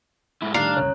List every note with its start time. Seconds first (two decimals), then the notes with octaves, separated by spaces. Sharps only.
0.42 G#2 E4
0.54 A2 D#3 G3 D4 D5 F5 A#5 F#6
0.77 F#1 C2 C#4 C#5